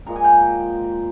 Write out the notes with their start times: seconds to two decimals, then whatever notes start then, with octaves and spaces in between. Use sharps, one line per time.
0.06 A#2 F3 G#3 A#5
0.16 G#5
0.24 G5 A#5